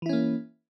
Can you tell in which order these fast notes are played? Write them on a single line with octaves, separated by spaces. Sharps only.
E3 E4 C#4 A#3